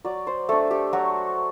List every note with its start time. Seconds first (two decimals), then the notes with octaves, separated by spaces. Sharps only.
0.05 F#3 D5
0.27 C5
0.49 A3 D4 A4
0.71 G4
0.93 F#3 F#4